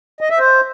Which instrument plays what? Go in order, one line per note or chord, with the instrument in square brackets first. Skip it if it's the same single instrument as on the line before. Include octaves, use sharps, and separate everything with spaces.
[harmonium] D#5
E5
C5